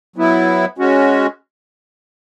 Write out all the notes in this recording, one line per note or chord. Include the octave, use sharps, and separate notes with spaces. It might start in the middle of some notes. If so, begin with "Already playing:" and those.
F#3 B3 E4
G#3 C#4 F#4